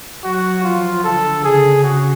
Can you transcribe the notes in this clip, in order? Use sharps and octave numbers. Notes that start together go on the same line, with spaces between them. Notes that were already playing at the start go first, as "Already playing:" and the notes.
F#3 F#4
F3 F4
D3 A4
C#3 G#4
F#4